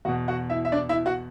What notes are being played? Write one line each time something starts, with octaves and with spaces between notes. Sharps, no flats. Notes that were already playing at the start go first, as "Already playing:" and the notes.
E2 B2 F#4 F#5
F#4 F#5
E4 E5
E5
D4 D5
E4 E5
F#4 F#5